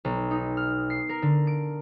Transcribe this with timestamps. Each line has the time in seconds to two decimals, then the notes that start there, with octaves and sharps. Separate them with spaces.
0.05 B1
0.31 D#4
0.57 F6
0.90 C7
1.09 A#4
1.22 D3
1.47 D7